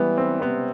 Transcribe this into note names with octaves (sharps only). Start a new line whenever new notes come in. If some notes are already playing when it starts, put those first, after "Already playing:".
Already playing: E3 G3 B3
C4
C3 B3